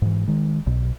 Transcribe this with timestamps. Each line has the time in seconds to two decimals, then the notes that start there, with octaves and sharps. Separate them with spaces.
0.02 G#2 E3
0.27 D#3 G#3
0.66 B1 B2